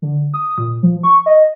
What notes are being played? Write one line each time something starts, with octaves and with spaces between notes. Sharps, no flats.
D3
D#6
A#2
F3
C#6
D#5